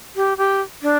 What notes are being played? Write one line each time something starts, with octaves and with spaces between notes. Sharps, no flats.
G4
G4
D4